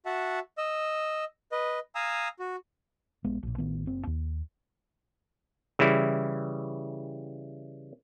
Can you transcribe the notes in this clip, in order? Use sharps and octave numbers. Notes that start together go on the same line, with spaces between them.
F#4 E5 F#5 A5
D#5 E6
B4 D#5
F5 G#5 A#5 D#6 E6
F#4
A#1 G#3 B3
A#1 A#2
A1 D#3 B3
F#1 C4
D#2
C#3 E3 G3 E4